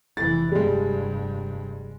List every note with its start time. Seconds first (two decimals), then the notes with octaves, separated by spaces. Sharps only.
0.17 F1 E3 A6
0.52 F1 G2 G3 G#3